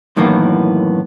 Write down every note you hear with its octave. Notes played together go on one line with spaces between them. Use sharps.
F#2 A2 D#3 E3 A#3 B3